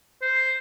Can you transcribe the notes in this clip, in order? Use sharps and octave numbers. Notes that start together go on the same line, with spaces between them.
C5